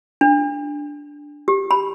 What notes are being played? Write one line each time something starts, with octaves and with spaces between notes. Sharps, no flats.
D4
G4
B5